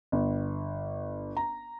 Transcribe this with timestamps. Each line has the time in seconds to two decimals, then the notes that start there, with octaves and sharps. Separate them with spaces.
0.12 G1
1.37 A#5